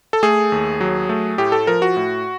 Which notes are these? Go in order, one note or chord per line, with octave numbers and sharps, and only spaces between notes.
A4
A3 G#4
D#2
F#3
A3
A2 G4
A4
F3 A#4
F#4
A2